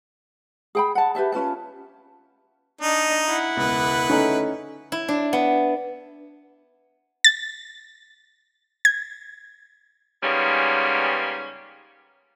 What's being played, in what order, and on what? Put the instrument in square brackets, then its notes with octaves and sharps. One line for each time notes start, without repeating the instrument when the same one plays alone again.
[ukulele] G#4 G5 B5
F#5 A5
G4 B4 E5 A5
C#4 F4 B4 A5
[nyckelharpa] D4 D#5 [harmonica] D#4
[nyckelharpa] E4 F#5
[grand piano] E1 C#2 [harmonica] B4
[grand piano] D3 A3 [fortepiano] C#4 D#4
[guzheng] E4
D4
B3
[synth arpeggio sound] A6
G#6
[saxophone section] G#2 C#3 G3 A#3 B3 C#4